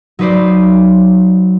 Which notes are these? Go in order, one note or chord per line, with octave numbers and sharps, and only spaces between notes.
F#3 D#4 B4 C5 D5